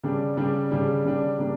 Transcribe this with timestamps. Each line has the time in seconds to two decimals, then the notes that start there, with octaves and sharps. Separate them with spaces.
0.03 C#3 G3 D4
0.37 C#3 G3 D4
0.71 C#3 G3 D4
1.05 C#3 G3 D4
1.39 C#3 G3 A#3 D4